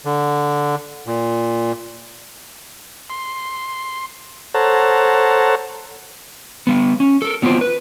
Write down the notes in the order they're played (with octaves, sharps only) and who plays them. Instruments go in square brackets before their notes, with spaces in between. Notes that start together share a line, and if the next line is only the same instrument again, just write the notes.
[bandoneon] D3
A#2
[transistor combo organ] C6
A4 C5 C#5 F#5 A5 A#5
[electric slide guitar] G3 B3
C#4
A4 A#4
F#3 B3 C4 E4 F4
B4